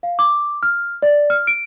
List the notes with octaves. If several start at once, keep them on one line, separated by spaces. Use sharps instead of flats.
F5
D6
F6
D5
F6
D7